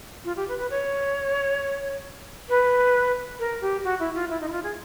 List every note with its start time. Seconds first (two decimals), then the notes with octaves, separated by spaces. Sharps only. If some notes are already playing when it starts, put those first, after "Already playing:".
0.25 F4
0.36 G4
0.48 B4
0.59 B4
0.70 C#5
2.49 B4
3.39 A#4
3.61 G4
3.84 F#4
3.99 E4
4.14 F4
4.30 E4
4.41 D#4
4.48 E4
4.52 F4
4.63 G#4